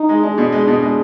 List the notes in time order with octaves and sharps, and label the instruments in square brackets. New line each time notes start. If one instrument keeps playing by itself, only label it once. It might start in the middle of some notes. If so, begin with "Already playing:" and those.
Already playing: [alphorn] D#4
[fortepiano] G#3
[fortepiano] G#3 [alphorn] D4
[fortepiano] B2
G#3
[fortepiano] B2 [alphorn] D4
[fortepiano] G#3